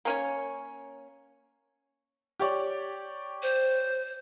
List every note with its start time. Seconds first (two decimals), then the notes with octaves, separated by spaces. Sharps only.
0.05 A#3 C#4 C#5
2.40 G4 C#5 D5
3.42 C5